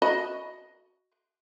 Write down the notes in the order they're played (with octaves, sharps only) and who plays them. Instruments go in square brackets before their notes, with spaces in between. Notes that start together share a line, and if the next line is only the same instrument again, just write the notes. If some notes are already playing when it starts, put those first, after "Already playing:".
[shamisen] F#4 D#5 B5